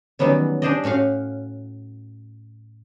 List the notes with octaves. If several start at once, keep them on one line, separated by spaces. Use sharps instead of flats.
D#3 E3 F#3 G3 B3 C#4
D4 G4 G#4 C5 D5 D#5
A2 C#4 F#4 F5